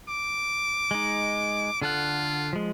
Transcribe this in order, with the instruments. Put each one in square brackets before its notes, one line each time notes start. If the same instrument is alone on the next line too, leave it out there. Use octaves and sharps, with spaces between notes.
[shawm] D6
[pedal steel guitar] G#3 D#4
[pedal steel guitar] D3 A4 F#5 [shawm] F4
[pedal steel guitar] F3 G#3